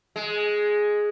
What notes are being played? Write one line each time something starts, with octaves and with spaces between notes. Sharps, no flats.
G#3